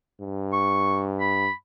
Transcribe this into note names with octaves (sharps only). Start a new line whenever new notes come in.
G2
C#6
B5